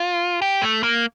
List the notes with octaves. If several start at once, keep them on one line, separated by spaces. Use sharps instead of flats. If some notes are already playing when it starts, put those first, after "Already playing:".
Already playing: F4
G4
A3
A#3